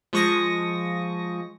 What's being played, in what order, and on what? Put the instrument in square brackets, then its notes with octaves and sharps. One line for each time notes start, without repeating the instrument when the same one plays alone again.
[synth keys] F3 G#3 C#6 D#6 A#6